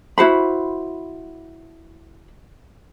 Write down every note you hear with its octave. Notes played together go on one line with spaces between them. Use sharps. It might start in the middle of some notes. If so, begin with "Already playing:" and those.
E4 F#4 C5 B5